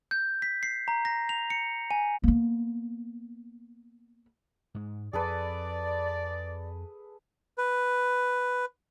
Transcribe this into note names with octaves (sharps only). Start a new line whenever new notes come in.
G6
B6
C7
A#5
A#6
F7
C#7
G#5
A#3 B3
G#2 G#3
F2 G#4 A4 B4 D5
B4